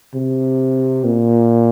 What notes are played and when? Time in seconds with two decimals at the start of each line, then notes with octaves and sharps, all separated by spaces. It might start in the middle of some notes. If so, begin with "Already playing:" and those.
0.15 C3
1.04 A#2